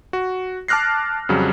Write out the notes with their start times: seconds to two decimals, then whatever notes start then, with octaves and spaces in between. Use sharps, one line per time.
0.13 F#4
0.68 A5 D6 F6 F#6 A#6 C7
1.29 F2 C#3 F#3 G3